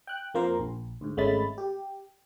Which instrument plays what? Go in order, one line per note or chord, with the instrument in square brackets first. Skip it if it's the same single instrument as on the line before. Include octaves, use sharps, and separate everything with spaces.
[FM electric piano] G5 F#6
F2 A#3 F4 A#4 C5
A#1
D2 G#2
G#1 G#3 A3 C#4 B5 A6
G4